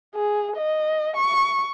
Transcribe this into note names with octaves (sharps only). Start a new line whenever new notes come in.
G#4
D#5
C#6